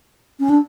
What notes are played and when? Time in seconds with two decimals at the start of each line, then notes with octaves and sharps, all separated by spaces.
0.40 C#4
0.49 D4